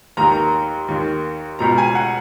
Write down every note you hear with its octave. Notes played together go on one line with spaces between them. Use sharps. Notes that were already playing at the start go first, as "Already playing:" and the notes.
D#2 D#3 A#5
A#5
D#2 D#3
C#2 B2 A#5
G#5
F#5